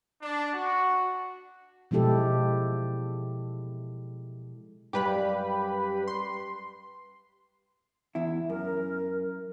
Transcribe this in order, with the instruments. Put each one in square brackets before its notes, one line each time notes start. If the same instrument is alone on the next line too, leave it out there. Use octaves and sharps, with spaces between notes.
[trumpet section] D4
F#4
[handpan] B2 F3 G#3 E4 G4 A4
[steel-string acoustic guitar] F#2 G3 F5 [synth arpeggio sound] G4 B4 B5
[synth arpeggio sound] C6
[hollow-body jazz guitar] E2 E4
[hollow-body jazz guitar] F#2 [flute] A#4